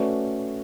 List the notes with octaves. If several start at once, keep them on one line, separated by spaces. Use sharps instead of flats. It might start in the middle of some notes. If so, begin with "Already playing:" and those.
Already playing: A3 C#4 F#4 B4 D5